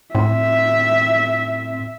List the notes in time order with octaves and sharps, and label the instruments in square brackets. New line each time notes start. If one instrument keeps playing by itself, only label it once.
[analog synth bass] A2 [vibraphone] C4 [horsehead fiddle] E5